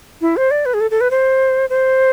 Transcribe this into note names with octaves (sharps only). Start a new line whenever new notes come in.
E4
C5
D5
B4
G#4
A4
A4
B4
C5
C5